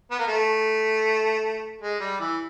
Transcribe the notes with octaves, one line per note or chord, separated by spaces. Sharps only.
B3
A#3
A3
G#3
G3
E3